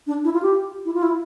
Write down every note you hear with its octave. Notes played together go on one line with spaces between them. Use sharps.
D4
E4
F4
G4
E4
F4
E4